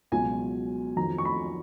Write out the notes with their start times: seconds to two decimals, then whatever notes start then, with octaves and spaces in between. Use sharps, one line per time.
0.12 C#2 B2 F#3 G#5
0.97 F2 D#3 F#3 A#5
1.18 C#6
1.25 B5